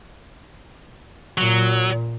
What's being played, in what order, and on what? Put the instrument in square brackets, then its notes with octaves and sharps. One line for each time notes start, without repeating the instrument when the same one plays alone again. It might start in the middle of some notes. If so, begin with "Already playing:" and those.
[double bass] A#2 [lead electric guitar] F#3